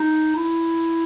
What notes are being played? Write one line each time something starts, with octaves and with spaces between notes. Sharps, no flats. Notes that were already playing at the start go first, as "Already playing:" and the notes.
Already playing: D#4
E4